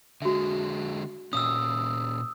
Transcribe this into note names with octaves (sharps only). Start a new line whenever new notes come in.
D3 G#3 F#4 E5
A#2 C#4 D#6 E6